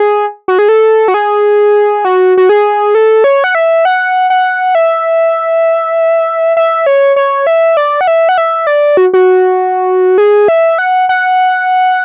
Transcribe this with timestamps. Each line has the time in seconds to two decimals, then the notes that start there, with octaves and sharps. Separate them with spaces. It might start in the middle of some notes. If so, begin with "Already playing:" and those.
Already playing: G#4
0.48 F#4
0.59 G#4
0.69 A4
1.08 F#4
1.14 G#4
2.05 F#4
2.37 F#4
2.49 G#4
2.95 A4
3.24 C#5
3.44 F#5
3.55 E5
3.85 F#5
4.30 F#5
4.75 E5
6.57 E5
6.86 C#5
7.16 C#5
7.47 E5
7.77 D5
8.01 F#5
8.07 E5
8.29 F#5
8.38 E5
8.67 D5
8.97 F#4
9.14 F#4
10.18 G#4
10.48 E5
10.78 F#5
11.09 F#5